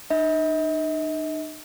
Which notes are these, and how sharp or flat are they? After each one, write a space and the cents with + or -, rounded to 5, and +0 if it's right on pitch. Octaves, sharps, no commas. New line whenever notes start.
D#4 -40 D#5 +45